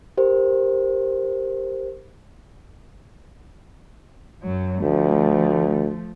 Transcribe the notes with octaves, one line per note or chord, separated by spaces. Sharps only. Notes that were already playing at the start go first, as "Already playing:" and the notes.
G4 A#4 C5
F#2 F#3
D2 F3 A3